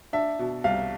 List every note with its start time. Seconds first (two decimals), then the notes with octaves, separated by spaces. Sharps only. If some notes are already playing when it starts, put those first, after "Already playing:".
0.13 D4 E5
0.39 B2
0.64 C2 F5